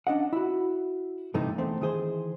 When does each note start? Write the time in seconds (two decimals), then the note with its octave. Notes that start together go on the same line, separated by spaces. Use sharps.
0.07 C#4 D4 D#5 F#5
0.33 E4 F#4
1.34 G2 C3 E3 A3 D#4
1.58 E2 A3 C4
1.81 D#3 E3 G#4 C5